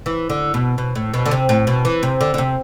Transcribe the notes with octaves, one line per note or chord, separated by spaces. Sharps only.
E3
D3
B2
B2
A2
B2
D3
C3
A2
B2
E3
C3
D3
D3
C3